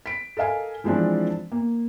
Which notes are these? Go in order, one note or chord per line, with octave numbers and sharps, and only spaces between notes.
B6 D7
A4 A#4 D#5 F5 G#5
E3 F3 G#3 C4 D4
A#3